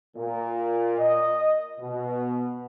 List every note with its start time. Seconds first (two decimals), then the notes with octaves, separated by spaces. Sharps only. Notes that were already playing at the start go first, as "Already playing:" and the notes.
0.16 A#2
0.98 D#5
1.79 B2